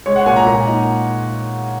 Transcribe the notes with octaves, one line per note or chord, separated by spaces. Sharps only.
G#3 C#5
F#5
A#2 G#5
A#5
A#2 A#5
D#4